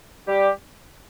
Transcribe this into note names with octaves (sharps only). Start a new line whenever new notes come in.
G3 G4